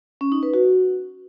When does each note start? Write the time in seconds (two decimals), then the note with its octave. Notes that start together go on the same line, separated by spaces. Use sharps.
0.21 C#4
0.32 D#4
0.43 B4
0.54 F#4